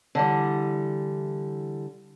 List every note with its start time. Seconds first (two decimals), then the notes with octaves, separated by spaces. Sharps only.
0.15 D3 E3 G3